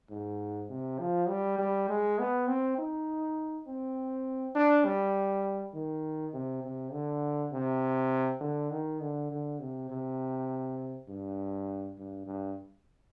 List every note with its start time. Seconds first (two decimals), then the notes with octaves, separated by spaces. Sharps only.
0.10 G#2
0.70 C3
1.00 F3
1.29 G3
1.59 G3
1.89 G#3
2.19 B3
2.48 C4
2.78 D#4
3.67 C4
4.55 D4
4.85 G3
5.74 D#3
6.34 C3
6.63 C3
6.92 D3
7.53 C3
8.41 D3
8.71 D#3
9.00 D3
9.31 D3
9.59 C3
9.90 C3
11.09 G2
11.98 G2
12.27 G2